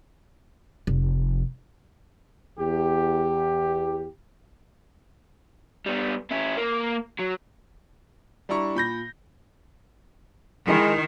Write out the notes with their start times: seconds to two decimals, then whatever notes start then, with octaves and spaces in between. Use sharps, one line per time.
0.87 F1
2.59 E2 G4
5.86 G3 B3
6.31 C#4 E4
6.57 A#3
7.19 F#3
8.49 G3 D4 E4 A#5 C#6
8.75 A#2 B5 G6 A#6
10.68 D#3 G#3 E4 A#4 B5